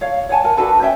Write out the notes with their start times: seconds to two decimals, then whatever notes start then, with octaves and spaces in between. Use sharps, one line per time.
0.01 C#5 F5
0.29 C#5 F#5 G#5 A5
0.44 A#4 G#5
0.57 D4 F#4 A4 B4
0.81 C#4 E5 G5 G#5